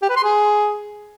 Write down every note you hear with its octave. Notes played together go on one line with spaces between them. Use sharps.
G4
B4
C6
G#4